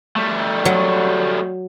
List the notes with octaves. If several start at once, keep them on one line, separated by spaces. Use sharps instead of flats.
G3 A3
F#3